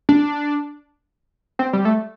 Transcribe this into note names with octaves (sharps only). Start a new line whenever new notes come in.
D4
C4
G3
A3